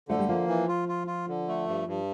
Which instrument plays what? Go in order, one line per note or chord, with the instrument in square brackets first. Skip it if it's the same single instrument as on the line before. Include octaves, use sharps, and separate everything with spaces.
[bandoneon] D3 [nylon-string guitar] F3 A3
[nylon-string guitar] G3
[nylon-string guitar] F3 [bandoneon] A#3
[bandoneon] E3
F4
F4
F4
D3
A3
G2
G2